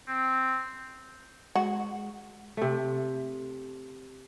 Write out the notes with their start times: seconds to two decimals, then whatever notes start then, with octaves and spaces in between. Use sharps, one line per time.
0.08 C4
1.55 G#3 F#4
2.57 C3 A3